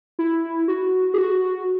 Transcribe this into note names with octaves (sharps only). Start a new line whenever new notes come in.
E4
F#4
G#4
F#4